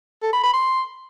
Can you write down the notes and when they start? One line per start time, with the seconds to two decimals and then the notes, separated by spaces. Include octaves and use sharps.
0.23 A4
0.33 B5
0.43 B5
0.54 C6